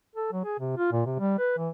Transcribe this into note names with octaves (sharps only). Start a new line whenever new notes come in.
A4
F#3
G#4
C3
F4
A#2
C3
G3
B4
E3